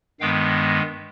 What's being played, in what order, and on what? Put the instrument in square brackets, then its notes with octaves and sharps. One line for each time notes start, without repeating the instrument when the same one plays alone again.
[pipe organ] G2 D#3 G#3 B3 F5 G5